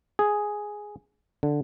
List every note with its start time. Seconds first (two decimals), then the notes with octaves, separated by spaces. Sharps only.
0.19 G#4
1.43 D3